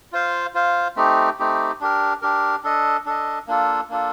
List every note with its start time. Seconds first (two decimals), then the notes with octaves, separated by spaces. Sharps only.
0.12 F4 C5 F5
0.54 F4 C5 F5
0.96 A3 C4 D#4 G4
1.39 A3 C4 D#4 G4
1.81 D4 G4 A#4
2.22 D4 G4 A#4
2.64 D4 A4 D#5
3.06 D4 A4 D#5
3.47 A#3 D4 F4 A4
3.89 A#3 D4 F4 A4